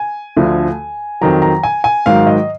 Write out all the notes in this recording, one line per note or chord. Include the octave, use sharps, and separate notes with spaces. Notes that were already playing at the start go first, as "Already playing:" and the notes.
Already playing: G#5
D2 D3 F3
F2 D#3 F#3 A#5
A#5
G#5
G#5
G#2 D#3 F#3 F5
D#5